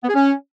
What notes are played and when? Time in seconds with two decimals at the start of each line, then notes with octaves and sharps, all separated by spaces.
0.03 B3
0.08 G#4
0.14 C#4